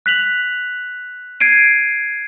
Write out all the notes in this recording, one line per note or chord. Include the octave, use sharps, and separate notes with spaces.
F#6 B6 F7 F#7
G#6 C7 D7 D#7